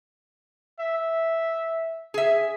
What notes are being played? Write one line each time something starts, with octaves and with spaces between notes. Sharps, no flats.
E5
G#4 E5